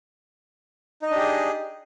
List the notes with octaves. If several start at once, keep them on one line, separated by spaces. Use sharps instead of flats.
D4 D#4 G4 G#4 D#5